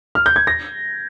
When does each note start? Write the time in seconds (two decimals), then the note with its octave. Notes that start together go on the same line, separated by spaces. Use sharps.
0.15 F6
0.26 G6
0.36 G#6
0.47 A#6